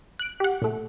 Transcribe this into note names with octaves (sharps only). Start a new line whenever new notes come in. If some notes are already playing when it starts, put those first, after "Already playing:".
F#6 D7
G4 F#5
A#2 A3